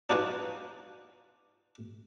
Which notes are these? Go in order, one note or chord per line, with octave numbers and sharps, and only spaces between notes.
D4 D#4 F4 F#4 B4 G#5